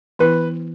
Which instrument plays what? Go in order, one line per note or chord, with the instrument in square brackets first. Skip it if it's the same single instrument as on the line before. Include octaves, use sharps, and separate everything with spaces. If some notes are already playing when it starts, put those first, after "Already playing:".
[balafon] E3 B3 E4 [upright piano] B4